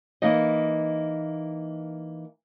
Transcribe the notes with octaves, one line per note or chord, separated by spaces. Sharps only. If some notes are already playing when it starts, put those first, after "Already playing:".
E3 A#3 D#4 D#5